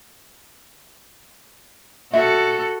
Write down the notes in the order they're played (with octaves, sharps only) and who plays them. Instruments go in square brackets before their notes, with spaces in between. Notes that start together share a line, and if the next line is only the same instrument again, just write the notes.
[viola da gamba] F#4 A4 [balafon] E5